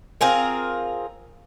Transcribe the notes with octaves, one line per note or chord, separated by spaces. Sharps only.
C4 F4 G#4 A#4